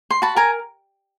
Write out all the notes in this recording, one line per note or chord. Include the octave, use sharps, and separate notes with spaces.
C6
F#4 A5 B5
A#4 G#5 A#5